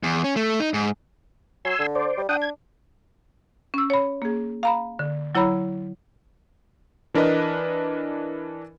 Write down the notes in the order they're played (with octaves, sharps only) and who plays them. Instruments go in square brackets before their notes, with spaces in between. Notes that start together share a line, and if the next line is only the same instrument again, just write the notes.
[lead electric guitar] E2
C#4
A3
D#4
G#2
[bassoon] F#3 [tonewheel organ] G#5 C6 E6
[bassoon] D3
[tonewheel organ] C5 D5
[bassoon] G3
[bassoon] D4 [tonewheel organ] F#5 G5 D#6
[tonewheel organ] G#6
[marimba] C#4 E6
C#5 B5
A#3 G#4
F5 A#5 B5
D3
F#3 E4 C#5 A#5 B5
[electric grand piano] E3 D4 A#4 B4 D#5